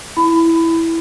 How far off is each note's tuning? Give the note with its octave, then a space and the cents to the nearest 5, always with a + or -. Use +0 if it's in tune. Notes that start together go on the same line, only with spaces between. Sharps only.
E4 +0 B5 +20